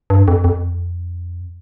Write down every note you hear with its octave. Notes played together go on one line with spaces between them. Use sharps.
G2
F2
F2